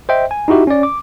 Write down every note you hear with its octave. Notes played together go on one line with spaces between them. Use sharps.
C5 D#5 E5 G5
G#5
D#4 E4 F#4 G4 E5
C#4 D5
D6